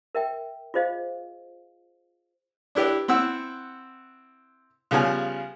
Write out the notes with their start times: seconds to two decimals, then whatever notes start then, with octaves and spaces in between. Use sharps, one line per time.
0.15 A#4 E5 G5
0.74 F4 G#4 C5 D#5 F5
2.75 D4 E4 G4 B4 D5
3.08 C4 E4 F#5 E6
4.91 C#3 F3 G3 B3 G#4 G#5